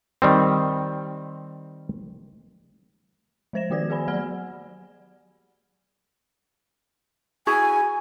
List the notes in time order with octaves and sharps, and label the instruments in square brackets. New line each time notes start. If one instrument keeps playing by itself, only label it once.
[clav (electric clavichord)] D#3 G3 C4
[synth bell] F3 G#3 C5 A#6 E7
D#3 B3 F#4 G4 D5 G#6
G#4 D5 G#5 B5
F#3 D5 F#5 F6 G#6 G7
[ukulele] E4 F#4 G#4 [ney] G#5